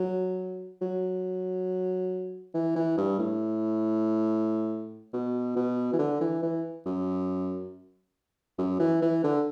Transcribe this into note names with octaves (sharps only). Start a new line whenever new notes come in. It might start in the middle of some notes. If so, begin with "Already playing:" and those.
Already playing: F#3
F#3
E3
E3
G2
A2
B2
B2
E3
D3
E3
E3
F#2
F#2
E3
E3
D3